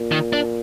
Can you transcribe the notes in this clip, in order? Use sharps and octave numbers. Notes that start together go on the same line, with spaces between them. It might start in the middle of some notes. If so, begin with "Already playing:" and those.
Already playing: A#2
D#3
D4